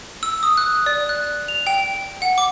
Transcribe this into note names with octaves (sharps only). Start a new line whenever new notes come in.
E6
D#6
F#6
D5
F#6
F7
G5
F#5
D6